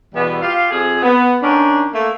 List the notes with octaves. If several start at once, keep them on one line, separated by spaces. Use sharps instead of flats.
E2 B2 E3 G3 B3
F4 G4 F5
F2 G#4
B3
D#3 C#4 D4
A3 A#3